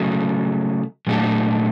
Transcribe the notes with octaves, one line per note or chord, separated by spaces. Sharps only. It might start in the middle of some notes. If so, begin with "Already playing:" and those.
Already playing: C#3 F#3 A3
A#2 F#3 A3 D4 G4